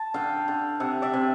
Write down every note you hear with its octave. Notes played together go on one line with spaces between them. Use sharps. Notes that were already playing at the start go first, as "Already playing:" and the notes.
Already playing: A5
D3 F5 G5
D3
C3 E5 F#5
D5 E5
C3